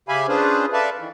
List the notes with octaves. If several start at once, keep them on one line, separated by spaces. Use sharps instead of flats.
C#3 G4 E5 F5 G#5 B5
C#4 D4 F4 G#4 B4 C5
A4 B4 D5 E5 F5 A5
D#3 E3